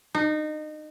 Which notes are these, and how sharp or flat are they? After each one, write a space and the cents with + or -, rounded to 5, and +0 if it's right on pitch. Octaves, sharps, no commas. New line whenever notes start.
D#4 -25